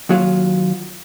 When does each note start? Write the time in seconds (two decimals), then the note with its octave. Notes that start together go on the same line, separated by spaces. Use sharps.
0.09 D#2 F#3 F4